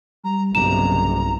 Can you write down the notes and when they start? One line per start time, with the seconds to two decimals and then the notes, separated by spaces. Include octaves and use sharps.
0.24 G3 A#5
0.55 F#1 B1 G2 C3 A#5 E7